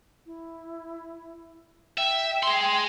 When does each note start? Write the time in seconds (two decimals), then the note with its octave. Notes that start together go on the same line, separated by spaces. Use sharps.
0.26 E4
1.98 E5 G5
2.43 G#4 C6